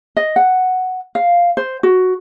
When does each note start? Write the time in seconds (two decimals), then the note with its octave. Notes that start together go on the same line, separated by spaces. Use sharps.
0.17 D#5
0.36 F#5
1.15 F5
1.57 C5
1.83 F#4